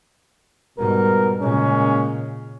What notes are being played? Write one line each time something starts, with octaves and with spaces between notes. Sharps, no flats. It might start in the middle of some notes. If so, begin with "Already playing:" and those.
G#2 B2 G3 A#4
A#2 C#3 G#3 A#3 C#4